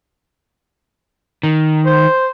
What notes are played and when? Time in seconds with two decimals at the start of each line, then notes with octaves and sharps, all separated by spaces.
1.43 D#3
1.86 C5